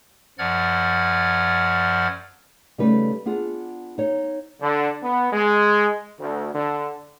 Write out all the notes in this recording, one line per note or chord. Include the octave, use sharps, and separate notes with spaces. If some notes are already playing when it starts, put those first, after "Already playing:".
F#2 F3 D5 F#5 F6 G#6
C#3 G3 A3 D#4 B4
B3 D4 F4 G#4
D#4 C#5
D3
B3
G#3
D2
D3